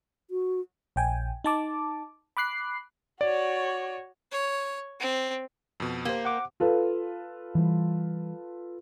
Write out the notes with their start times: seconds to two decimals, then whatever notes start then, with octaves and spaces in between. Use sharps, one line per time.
0.31 F#4
0.96 A#1 G5 G#5
1.44 D#4 A5 D6
2.37 B5 D6 F#6 C7
3.21 F#4 C#5 D5
4.32 C#5
5.00 C4
5.80 F2 B2
6.05 A#3 G4 C5
6.25 F#5 D6
6.60 F4 A4 B4
7.55 E3 G3